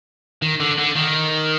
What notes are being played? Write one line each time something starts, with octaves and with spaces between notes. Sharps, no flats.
D#3
D3
D3
D#3